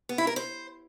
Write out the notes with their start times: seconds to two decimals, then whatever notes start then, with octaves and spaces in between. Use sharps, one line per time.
0.09 B3
0.18 E4
0.27 A#4
0.36 C5